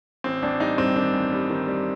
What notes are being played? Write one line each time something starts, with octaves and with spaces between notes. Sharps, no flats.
A1 C4
A1 D4
G3 D#4
G2 C4
D#3 D4
A1
G3
D#3
G3